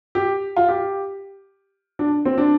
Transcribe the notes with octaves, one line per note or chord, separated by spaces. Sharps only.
G4
F4
G4
D4
C4
D4